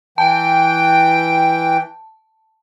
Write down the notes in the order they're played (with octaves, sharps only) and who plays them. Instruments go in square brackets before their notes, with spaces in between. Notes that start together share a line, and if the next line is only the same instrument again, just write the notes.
[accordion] E3 G5 [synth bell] A5